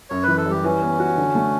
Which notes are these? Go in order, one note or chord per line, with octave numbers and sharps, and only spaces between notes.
F#2 C#5
E3 B4
A4
G3 G4
E3 C#4
B3
F#4
D3
A3